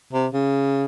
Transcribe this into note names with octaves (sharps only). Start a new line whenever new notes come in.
C3
C#3